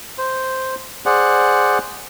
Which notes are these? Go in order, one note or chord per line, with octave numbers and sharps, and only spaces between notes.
C5
G#4 C5 D5 F#5